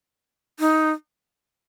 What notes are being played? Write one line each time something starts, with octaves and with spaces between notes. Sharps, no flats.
D#4